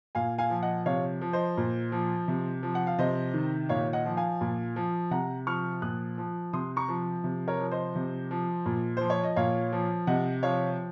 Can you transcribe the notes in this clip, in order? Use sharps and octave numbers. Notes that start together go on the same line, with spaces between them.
A#2 F5 G#5
F5 G#5
F3
D#5 F#5
C3 C#5 F5
F3
C5 D#5
A#2
F3
C3
F3
F#5
F5
C3 C5 D#5
D#3
A#2 C#5 F5
D#5 F#5
F3
F5 G#5
A#2
F3
C3 F#5 A#5
F3 C#6 F6
A#2 D#6 F#6
F3
C3 C6 D#6
A#5 C#6
F3
C3
A#4 C#5
F3
C5 D#5
C3
F3
A#2
F3 C5
C#5
D#5
A#2 C#5 F5
F3
C3 D#5 F#5
F3 C#5 F5